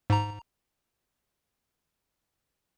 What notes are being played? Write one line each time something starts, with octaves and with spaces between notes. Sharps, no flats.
G#2 A#5